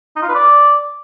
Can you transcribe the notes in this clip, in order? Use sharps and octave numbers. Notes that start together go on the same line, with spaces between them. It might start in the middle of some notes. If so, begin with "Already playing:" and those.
D#4
F4
B4
D5